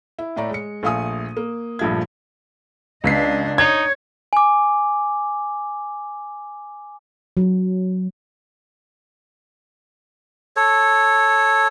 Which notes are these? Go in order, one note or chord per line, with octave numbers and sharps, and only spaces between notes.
E4
A2 A3 D5 A#5
G#3 C#7
A#1 A3 F5 G#5 D#6 D#7
A#3
A#1 G2 F3 A3 G#6
C#2 D4 D#5 B6 C7
D#4 C#5 G#6
G#5 D6
F#3
A4 C#5